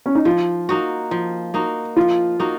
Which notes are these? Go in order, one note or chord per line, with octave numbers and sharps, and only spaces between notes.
C#4
D#4
F3 F4
A#3 D#4 F#4
F3
A#3 D#4 F#4
F3 F4
A#3 D#4 F#4